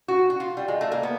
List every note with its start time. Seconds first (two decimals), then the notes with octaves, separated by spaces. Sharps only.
0.08 F#4
0.30 F#4
0.40 F4
0.57 G3
0.68 G#3
0.81 A3
0.92 A#3
1.03 B3